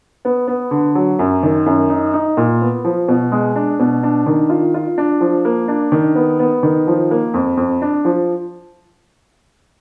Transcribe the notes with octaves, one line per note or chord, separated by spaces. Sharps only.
B3
B3
D3
F#3
F#2
D#3
F#2
D#4
D#4
A#2
B3
F3
B2
G#3
D4
B2
D4
D#3
F4
F4
D4
F3
A#3
D4
D#3
B3
B3
D#3
F3
A#3
F2
F2
D4
F3